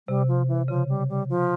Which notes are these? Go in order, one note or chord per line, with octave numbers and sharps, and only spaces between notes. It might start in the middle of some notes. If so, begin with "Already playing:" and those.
C3 G3
F3
E3
C#3 F3
G3
G3
F3